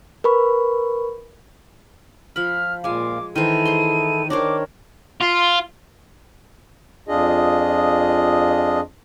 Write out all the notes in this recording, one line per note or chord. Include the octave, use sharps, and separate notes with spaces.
A#4 B4 B5 C#6
F3 B5 F6
A#2 G#3 F4 F5 G#5 D6
D#3 E3 E4 A4 C5 D#7
G#4 C5 C6
D#3 D4 A#4 C5 C#5 D6
F4
F2 D4 F4 G#4 D#5